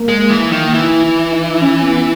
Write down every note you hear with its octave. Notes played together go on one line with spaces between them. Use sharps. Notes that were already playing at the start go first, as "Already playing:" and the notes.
Already playing: A#3
G#3
E3
D#3
E3 E4
E4
D#4
C#4
B3